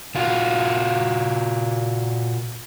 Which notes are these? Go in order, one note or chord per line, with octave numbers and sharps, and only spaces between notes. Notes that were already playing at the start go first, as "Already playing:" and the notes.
A#2 F4 F#4